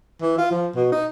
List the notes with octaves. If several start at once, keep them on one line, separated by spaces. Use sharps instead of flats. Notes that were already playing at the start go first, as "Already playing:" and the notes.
E3
F4
F3
B2
D#4